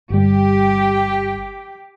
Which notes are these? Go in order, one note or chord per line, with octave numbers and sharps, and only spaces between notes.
G1 G3 G4